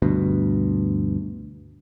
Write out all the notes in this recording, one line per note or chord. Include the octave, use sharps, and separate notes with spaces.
D2 G2 B2